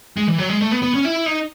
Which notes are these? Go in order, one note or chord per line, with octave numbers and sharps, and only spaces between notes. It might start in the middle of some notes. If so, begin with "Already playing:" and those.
G#3
E3
F#3
G#3
A3
B3
B3
C#4
E4
D#4